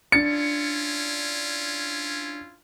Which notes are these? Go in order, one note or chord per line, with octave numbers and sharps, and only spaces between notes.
C#4 D4 E4 F4 A6 C#7